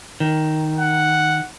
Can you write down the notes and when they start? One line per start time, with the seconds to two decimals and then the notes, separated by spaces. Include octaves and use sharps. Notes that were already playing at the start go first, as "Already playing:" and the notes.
0.20 D#3
0.79 F#5